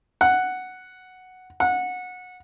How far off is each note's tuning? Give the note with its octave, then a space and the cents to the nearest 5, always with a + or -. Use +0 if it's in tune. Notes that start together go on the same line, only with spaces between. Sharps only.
F#5 +0
F#5 -20